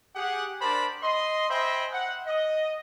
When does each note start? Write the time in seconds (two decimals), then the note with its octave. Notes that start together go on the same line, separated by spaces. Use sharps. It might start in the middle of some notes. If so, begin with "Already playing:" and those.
0.16 G4 G#4 F#5
0.61 D4 A#4 C5 D5 A5 B5
1.02 D#5 C6
1.50 C5 D#5 E5 G5 G#5 B5
1.93 F#5
2.26 D#5